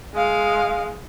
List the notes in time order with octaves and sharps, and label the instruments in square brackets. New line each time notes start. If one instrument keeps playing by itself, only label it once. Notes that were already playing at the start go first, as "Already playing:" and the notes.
[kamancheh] G#3 F5